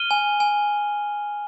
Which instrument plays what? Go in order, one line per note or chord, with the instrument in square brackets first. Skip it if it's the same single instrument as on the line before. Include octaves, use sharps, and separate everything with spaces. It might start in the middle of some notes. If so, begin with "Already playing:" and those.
Already playing: [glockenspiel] F6 D#7 G7
G#5
G#5